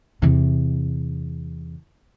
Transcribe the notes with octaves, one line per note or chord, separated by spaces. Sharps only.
E2 C3